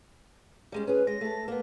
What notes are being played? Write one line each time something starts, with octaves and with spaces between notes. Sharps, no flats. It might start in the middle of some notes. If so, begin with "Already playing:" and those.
G3 G#3 C#4
C#4 G#4 B4
G#3 A#6
A3 A4
A#3 B3